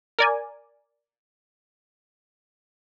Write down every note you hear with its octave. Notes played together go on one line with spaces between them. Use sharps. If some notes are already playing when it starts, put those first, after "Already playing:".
A#4 D5 G#5